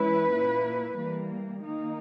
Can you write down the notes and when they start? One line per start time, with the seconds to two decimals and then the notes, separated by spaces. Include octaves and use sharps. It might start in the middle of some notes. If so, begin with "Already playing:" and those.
Already playing: E3 G#3 C#4 E4 B4
0.32 A#2 A#3 E4
0.97 E3 G3 A#3
1.62 D#3 A#3 D#4